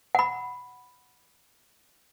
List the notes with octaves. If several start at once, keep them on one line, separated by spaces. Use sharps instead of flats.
F#5 B5